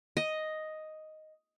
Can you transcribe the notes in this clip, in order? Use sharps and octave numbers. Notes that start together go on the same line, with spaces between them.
D#5